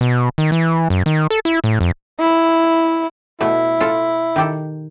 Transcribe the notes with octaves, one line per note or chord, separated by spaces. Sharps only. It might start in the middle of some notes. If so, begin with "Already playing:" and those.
B2
D#3
E3
F#2
D#3
A4
E4
A2
F2
E4
B2 A3 E4
F4 A4
D#3 G4 A4